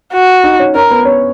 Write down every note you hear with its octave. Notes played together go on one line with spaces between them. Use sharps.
F#4
D#4 D#5
C#4 C#5
C#4 A#4 C#5
B3 B4
C#4 C#5